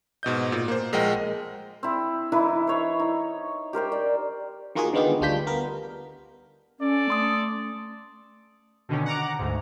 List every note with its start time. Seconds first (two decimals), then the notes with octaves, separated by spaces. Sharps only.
0.23 G#2 B2 D#5 G6
0.52 A#2
0.68 A#3 C5
0.93 A#1 G#3 A#4 D#5 F#5 G5
1.83 C4 E4
2.32 E3 D#4 E4 B4
2.67 C5 C#5
3.00 D#4
3.73 G4 A#4 C5 G5
3.92 D5
4.75 D#3 A#3 F4 F#4 G#4
4.93 D3 D#3 G#3 B3 F4 G4
5.21 D2 G3 D4 F4 G6 B6
5.47 B3 A#4
6.80 C#4 A4 D5
7.10 A3 C6 D#6
8.89 B2 D3 D#3 C#4
9.06 F#5 A#5 D6
9.39 D2 G#2